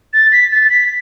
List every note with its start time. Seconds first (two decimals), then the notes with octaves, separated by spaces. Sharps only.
0.13 A6
0.32 B6
0.52 A6
0.70 B6